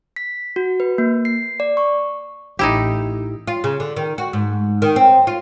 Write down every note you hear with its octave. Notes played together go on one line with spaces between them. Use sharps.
B6
F#4
B4
A#3
C7
D5
C#6
A1 D#4 E4 G4
F4
C#3
D3
D#3
F#4
G#2
D#3
C4
F4